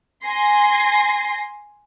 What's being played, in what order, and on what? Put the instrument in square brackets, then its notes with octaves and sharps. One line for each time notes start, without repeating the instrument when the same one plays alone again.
[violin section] G#5 C6 A#6 C7